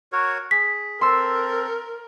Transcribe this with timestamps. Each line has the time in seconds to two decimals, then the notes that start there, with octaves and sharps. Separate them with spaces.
0.12 F#4 A#4 C#5
0.51 G#4 B6
1.01 C4 A4 A#4 C6 E6